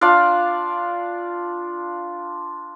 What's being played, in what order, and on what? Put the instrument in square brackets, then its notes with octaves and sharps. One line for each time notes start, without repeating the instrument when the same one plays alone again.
[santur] D4 F4 D5 F5